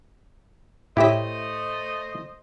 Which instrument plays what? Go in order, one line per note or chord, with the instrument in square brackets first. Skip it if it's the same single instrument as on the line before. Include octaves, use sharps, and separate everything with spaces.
[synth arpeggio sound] A2 E5 [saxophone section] A3 C5 D#5 [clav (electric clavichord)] E4 G4 C#5